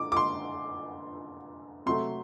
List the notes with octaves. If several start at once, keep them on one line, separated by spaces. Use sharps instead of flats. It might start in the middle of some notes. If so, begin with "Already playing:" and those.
Already playing: D3 D6
D6
C6
C3 F#3 A3 C6